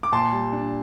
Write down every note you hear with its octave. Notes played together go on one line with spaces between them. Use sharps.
D6
A#2 A5 C6
G3
D4